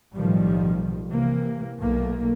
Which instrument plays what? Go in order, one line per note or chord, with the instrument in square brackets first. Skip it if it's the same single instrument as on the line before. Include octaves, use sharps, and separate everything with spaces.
[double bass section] B1 A2 D#3 F3 G3
C3 E3 A#3
B1 A3 A#3